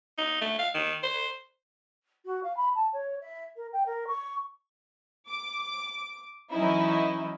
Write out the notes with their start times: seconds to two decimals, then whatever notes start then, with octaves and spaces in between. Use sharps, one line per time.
0.18 D#4
0.41 A3
0.59 F5
0.74 D#3
1.03 C5
2.25 F#4
2.43 F5
2.56 B5
2.75 A5
2.93 C#5
3.21 E5
3.56 A#4
3.72 G5
3.86 A#4
4.07 C#6
5.29 D6
6.52 E3 F#3 C#4 D#4 E4